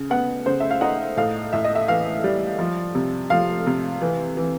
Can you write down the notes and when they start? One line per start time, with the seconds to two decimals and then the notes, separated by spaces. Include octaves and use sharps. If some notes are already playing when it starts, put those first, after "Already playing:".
Already playing: C#3
0.10 B3 F#5
0.46 C#3 C5
0.60 E5
0.70 F5
0.81 D#4 F#5
1.17 A2 F5
1.53 A2 E5
1.64 D#5
1.75 E5
1.88 E3 F5
2.24 G3
2.59 F3
2.95 C3
3.30 F3 F5
3.66 C3
4.02 E3
4.37 E3